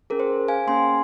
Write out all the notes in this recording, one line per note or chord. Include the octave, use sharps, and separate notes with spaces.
C#4 G#4 A#4
C5
F5 G#5
A#3 C#4 G#4 G#5 C6